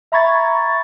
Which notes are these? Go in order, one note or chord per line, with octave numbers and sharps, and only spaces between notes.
E5 A#5 B5 C#6 G#6 A6